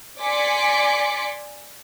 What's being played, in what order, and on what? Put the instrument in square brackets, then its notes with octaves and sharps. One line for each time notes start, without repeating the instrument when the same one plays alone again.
[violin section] D5 G#5 C6 D6 B6 C#7